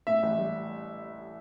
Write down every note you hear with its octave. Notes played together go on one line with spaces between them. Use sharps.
A2 E5
A1
G3